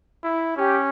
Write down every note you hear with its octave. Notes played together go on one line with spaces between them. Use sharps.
E4
C#4 G4